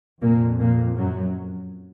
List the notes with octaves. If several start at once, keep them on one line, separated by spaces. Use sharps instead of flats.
F2 A#2 A#3
A#2 A#3
F#2 F#3